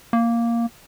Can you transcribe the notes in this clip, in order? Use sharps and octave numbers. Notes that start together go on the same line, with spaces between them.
A#3